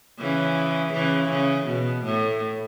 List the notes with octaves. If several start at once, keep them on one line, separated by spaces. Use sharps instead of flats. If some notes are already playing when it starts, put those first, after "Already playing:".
C#3 E3
C#3 E3
C#3
B2
A2